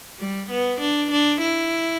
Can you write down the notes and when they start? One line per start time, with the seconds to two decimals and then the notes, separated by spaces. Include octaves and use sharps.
0.19 G3
0.50 B3
0.81 D4
1.11 D4
1.42 E4